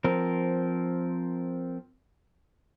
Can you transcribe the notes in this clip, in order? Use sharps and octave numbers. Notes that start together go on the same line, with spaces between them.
F3 C4 A#4